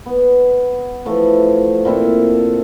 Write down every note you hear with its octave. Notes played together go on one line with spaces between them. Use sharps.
B3
E3 F3 A3
A#2 C4 E4 A4